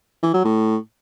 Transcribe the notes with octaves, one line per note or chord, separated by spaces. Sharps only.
E3
F#3
A2